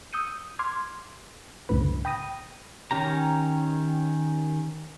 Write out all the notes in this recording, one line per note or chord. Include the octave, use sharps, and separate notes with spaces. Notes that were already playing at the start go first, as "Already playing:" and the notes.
D#6 E6 G6 C#7 D#7
C6 D6 F6 G#6
C#2 F#2 A2 D3 B4
G5 B5 D#6 A#6 D#7
D#3 C#4 G4 A#5